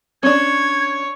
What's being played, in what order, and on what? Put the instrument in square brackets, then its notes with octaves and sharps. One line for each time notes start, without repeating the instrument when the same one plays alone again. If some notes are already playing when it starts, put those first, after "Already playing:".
[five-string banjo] C#4 D4 [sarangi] C#5 [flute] G#6